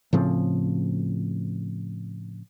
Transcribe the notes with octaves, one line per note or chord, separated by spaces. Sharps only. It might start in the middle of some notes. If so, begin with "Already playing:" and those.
A2 C#3 F3 C4